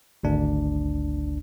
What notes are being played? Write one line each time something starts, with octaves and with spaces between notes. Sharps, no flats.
G#1 D2 D4